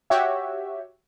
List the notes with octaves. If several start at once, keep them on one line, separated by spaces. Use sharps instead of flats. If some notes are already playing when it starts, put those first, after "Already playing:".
F#4 G4 C#5 E5